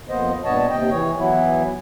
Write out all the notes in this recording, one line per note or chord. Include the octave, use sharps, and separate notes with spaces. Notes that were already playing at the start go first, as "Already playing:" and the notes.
F2 A#3 B3 C5 D#5
G2 A#2 B3 C#5 D#5 A5
D#2 C3 D#5 G5
E3 C#5
E3 F#3 B3 E4